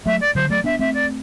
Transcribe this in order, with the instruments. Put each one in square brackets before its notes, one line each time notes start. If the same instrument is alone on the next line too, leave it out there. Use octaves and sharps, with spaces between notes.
[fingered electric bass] F#3 A3 [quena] E5
[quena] D5
[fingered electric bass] D3 F#3 [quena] C5
[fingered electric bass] F#3 A3 [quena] D5
[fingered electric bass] B3 D4 [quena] E5
[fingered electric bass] A3 C4 [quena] E5
[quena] D5